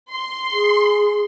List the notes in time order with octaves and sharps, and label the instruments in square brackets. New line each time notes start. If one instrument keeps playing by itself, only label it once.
[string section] C6
[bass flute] G#4